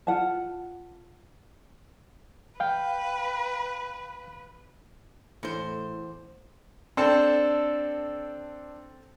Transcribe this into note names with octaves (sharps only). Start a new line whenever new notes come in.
F4 F#5 A5
B4 F5 G5
E2 A2 C5
C4 D4 A4 C5